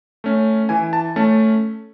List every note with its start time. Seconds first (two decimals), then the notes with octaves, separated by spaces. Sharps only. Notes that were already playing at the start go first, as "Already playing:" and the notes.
0.24 A3 C#4
0.69 E3 G#5
0.93 A5
1.16 A3 C#4 A5